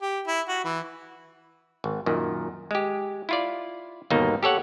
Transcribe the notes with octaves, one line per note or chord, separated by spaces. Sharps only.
G4
E4
F#4
E3
G#1
F#2 A#2 D#3
G#3 G4
E4 F4 D5
G1 D#2 B2 A#3 D#4
G4 A4 C#5 F#5